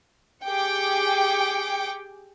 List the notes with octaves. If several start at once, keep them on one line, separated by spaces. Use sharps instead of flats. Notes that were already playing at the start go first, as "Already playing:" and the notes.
G4 G#4 G5 D6 C#7